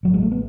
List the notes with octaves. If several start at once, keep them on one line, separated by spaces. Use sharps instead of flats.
A1 G#2 F#3
G#3
A3
B3